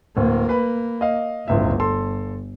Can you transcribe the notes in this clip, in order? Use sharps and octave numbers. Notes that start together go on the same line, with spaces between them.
D1 A#3
B4 B5
D#5 F5
D1 G1 C#2 E5
A4 C6